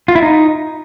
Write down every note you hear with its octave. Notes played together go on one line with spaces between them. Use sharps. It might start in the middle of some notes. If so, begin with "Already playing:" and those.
F4
E4
D#4